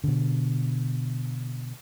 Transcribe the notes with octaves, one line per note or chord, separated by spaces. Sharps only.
B2 D3